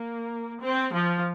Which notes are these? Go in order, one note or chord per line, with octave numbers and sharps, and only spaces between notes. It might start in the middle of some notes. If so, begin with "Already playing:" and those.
Already playing: A#3
C4
F3